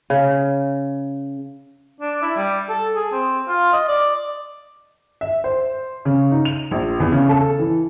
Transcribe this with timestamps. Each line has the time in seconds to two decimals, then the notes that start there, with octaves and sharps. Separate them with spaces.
0.10 C#3
2.00 D4
2.22 E4
2.36 G3
2.69 A4
2.96 G#4
3.12 C4
3.48 F4
3.73 D#5
3.88 D5
5.21 E5
5.44 C5
6.05 C#3
6.32 D#4
6.45 F7
6.71 A#1
7.00 E2
7.12 C#3
7.29 A4
7.59 E3